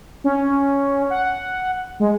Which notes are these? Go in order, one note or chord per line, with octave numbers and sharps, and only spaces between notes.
C#4
F#5
G#3